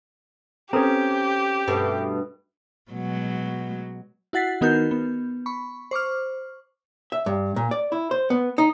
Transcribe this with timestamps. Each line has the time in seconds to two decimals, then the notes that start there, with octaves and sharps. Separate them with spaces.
0.73 C4 C#4 G4 A4 B4 A#5
1.67 G2 B2 A3
2.91 B2 F#3 G#3
4.33 E4 F#4 F#5 A6 B6 C7
4.61 D#3 B3 D#4 F#4 A#4 G6
4.91 B3
5.46 B5 C#6
5.91 C5 C#6 D6 F6
7.12 E5
7.26 G2
7.56 A#2
7.71 D5
7.92 E4
8.11 C5
8.30 B3
8.58 D#4